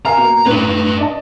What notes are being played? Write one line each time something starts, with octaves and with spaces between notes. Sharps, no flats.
A#4 F5 G#5 A#5
B2 A#3
A2 D4 B4
D5 D#5 A5